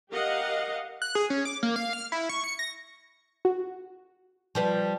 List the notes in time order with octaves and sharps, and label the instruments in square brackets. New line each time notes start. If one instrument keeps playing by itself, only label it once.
[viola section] G4 A#4 D#5 F5 F#5
[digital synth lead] F#6
G#4
C#4
D6
A#3
F5
F6
E4
C#6
C#7
A#6
[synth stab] F#4
[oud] F3 G3 B4